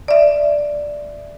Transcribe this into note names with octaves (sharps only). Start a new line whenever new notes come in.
D5 E5